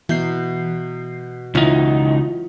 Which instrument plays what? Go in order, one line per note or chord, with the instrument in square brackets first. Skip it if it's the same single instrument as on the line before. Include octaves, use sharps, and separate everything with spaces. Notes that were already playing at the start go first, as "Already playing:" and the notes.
[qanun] B2 [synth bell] E3 G6 C7
[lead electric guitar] C#2 D#4 [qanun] E3 F#3 C#5 [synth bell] F4